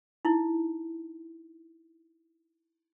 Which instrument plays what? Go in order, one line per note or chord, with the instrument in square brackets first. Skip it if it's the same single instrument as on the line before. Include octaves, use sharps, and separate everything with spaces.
[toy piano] D#4 E4